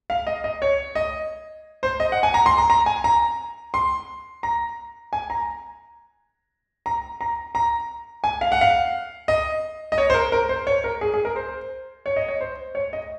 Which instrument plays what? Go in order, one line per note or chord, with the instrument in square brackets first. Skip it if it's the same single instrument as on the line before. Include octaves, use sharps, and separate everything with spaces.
[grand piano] F5
D#5
D#5
C#5
D#5
C5
D#5
F#5
G#5
A#5
C6
A#5
A#5
G#5
A#5
C6
A#5
G#5
A#5
A#5
A#5
A#5
G#5
F5
F#5
F5
D#5
D#5
C#5
C5
A#4
A#4
C5
C#5
A#4
G#4
G#4
A#4
C5
C#5
D#5
C#5
C5
C#5
D#5